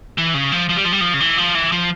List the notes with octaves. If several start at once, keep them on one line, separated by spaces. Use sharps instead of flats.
E3
C#3
F3
F3
G3
F3
G3
F3
C#3
E3
F3
E3
F3